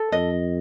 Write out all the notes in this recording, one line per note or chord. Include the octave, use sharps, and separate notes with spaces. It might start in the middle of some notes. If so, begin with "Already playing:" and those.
Already playing: A4
F2 D#5